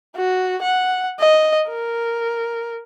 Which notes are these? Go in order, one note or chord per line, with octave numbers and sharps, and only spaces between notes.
F#4
F#5
D#5
A#4